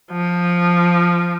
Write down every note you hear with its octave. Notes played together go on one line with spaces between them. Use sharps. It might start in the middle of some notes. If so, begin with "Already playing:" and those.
F3